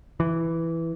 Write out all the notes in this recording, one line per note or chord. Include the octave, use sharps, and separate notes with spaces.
E3